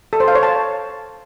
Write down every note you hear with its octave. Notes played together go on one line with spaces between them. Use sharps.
A4
C5
F5
C#5
A5